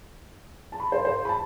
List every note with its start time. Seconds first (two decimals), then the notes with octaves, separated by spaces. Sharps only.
0.72 A5
0.80 B5
0.92 C5
1.05 C5
1.25 B5
1.29 A5